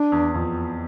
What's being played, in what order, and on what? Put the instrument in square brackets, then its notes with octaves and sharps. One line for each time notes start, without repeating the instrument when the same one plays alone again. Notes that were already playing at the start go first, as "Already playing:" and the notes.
Already playing: [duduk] D4
[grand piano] E2
F2